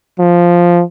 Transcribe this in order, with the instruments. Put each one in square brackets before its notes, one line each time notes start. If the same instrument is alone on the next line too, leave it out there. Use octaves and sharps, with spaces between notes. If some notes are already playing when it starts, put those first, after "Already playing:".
[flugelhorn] F3